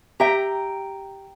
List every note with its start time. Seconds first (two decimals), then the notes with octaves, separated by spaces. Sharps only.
0.20 G4 E5 G5 A#5